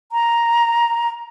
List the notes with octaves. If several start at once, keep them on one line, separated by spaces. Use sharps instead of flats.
A#5